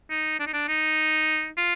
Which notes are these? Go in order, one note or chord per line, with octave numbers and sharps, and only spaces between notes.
D#4
D4
D#4
D4
D#4
F4